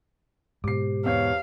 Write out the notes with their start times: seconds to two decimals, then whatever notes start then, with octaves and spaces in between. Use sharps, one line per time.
0.64 G#2 B2 G4 C5 D6 C7
1.05 E2 C#5 F5